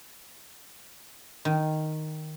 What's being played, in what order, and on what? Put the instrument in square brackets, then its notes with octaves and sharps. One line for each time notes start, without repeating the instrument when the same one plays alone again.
[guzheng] D#3